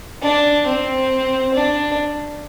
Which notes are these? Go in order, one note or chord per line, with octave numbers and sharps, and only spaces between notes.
D4
C4
D4